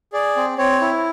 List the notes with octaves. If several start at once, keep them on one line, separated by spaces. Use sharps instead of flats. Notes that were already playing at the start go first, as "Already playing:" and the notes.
G#4 D5
C4
C4 C#5
E4